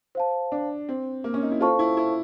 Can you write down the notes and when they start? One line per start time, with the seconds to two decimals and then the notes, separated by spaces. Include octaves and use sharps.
0.15 C5 F5 A5
0.52 D4
0.89 C4
1.24 A#3
1.34 C#4
1.42 D#4
1.51 E4
1.61 F4 A4 C5 F5 A5 C#6
1.79 E4
1.97 E4